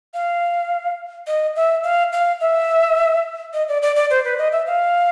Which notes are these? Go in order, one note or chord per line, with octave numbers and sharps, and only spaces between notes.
F5
D#5
E5
F5
F5
E5
D#5
D5
D5
D5
C5
B4
D#5
E5
F5